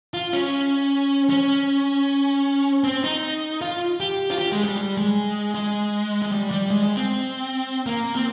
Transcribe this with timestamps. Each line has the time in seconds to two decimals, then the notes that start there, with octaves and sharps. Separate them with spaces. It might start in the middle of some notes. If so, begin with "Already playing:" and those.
0.14 F4
0.33 C#4
1.30 C#4
2.84 C4
3.04 D#4
3.61 F4
4.00 G4
4.31 F4
4.38 G4
4.52 G#3
4.64 G3
4.78 G3
4.97 G#3
5.55 G#3
6.22 G#3
6.32 G3
6.51 G3
6.71 G#3
6.83 G#3
6.96 C4
7.86 A#3
8.15 C4